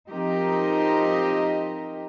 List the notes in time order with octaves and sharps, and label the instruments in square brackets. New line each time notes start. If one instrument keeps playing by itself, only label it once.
[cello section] F3 C4 D#4 G4 A#4 D#5